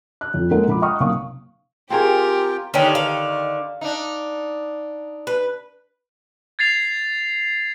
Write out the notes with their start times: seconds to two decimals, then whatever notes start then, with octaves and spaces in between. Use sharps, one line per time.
0.21 F#6
0.34 F2
0.51 G#3 A#3 C#4 A4 A#4 F#5
0.68 A#1 B5 D6
0.82 F#5 G5 A#5 C#6 D#6 F6
1.00 B1 C3 A#3 F5 C#6 D#6
1.90 C4 F4 G4 G#4 A#4 C#5 G5
2.74 D3 D#3 C#4 D#4 G4
2.95 F5
3.81 D4 D#4
5.27 B4
6.59 G#6 A6 C7 F7